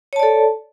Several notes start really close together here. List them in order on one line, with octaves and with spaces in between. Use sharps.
C#5 A5 D5 A4